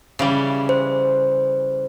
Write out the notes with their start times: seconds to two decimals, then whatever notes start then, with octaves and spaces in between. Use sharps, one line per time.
0.19 C#3 E3 G3
0.69 C5